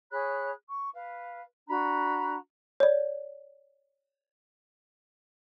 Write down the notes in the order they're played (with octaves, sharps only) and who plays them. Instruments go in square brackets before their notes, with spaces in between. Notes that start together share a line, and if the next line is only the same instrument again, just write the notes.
[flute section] G#4 C#5 B5 F#6
C#6
B4 F5
D4 F#4 A#5 B5
[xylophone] C#5 D5